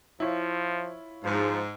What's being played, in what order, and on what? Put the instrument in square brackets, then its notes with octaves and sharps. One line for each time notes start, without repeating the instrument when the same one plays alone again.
[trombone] F3 [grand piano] E4 F4 C#5
[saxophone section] G#2 [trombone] F3